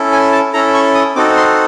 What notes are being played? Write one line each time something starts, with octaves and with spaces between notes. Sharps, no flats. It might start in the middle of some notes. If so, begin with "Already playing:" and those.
Already playing: C#4 E4 A4
G#5
A5
C#4 E4 A4 A#5
C#6
D#6
C4 D#4 F#4 A4 D6
C6